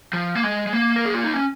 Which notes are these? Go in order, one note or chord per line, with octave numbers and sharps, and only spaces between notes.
F3
A#3
G#3
G#3
A#3
A#4
G#4
F4
D#4
C#4